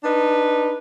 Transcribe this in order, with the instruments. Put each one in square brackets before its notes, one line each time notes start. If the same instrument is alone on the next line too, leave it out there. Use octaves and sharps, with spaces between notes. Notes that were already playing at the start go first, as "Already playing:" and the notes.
[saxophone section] D4 D#4 B4